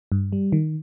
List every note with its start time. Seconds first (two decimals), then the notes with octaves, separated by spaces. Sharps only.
0.12 G2
0.32 G3
0.52 D#3